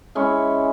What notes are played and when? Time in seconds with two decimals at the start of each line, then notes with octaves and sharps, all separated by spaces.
0.15 G#3 C#4 E4